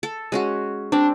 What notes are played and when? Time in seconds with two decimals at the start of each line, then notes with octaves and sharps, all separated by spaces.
0.03 A4
0.32 G#3 C#4 F#4
0.92 C4 D4